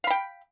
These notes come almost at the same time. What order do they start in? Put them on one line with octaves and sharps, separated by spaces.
F5 B5 G5